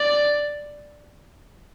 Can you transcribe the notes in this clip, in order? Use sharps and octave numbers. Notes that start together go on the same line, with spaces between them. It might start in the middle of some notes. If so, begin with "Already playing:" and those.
Already playing: D5